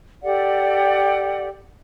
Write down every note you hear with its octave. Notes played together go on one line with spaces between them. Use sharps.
G4 A4 D5 F#5